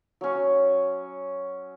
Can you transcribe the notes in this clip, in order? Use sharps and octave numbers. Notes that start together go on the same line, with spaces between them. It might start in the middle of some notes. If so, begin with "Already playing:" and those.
F#3 C#4